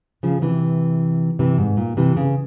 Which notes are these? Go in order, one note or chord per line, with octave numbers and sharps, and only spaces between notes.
C#3 F3
C3 E3
C3 E3
G#2
A#2
C3 E3
C#3